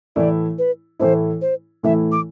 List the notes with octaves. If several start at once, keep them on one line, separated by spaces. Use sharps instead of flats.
A2 E3 A3 E4 D5
B4
A2 E3 A3 E4 C5
C5
A2 E3 A3 E4 E5
D6